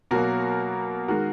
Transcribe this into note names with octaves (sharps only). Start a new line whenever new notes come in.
B2 F#3 A#3 F#4 A#4
D#3 G#3 F#4 A#4